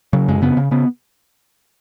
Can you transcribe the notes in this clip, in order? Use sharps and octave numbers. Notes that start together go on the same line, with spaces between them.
C#3 F#3
F#2 G#3
C#3 B3
C#3
C#3 B3